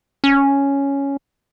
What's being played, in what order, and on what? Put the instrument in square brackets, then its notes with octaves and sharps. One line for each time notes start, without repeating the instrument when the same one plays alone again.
[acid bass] C#4